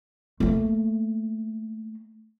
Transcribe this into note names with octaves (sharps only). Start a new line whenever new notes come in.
A3 A#3